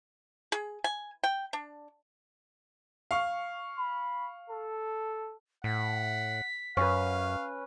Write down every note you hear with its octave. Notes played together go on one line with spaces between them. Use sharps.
G#4
G#5
G5
D4
F5 C#6 F6
B5
A4
A2 F#5 B6
F#2 C#4 B4 F5